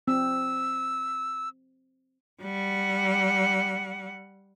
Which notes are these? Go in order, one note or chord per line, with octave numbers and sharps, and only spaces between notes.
C4 E6
G3 F#5